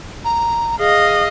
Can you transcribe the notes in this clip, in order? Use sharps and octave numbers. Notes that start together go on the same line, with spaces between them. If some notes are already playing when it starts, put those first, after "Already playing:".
A#5
G#4 D#5 F5